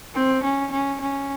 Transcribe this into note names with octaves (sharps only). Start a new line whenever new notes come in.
C4
C#4
C#4
C#4